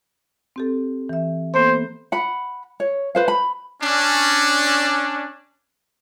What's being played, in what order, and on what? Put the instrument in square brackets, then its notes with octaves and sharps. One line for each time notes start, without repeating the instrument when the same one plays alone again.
[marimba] C4 G4 A4
E3 E5
[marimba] A#3 B3 A4 [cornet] C5
[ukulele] F#5 B5
C#5
B4 C5 F5
B5
[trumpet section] C#4 D4